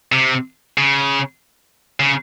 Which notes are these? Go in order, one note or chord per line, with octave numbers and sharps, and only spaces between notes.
C3
C#3
C#3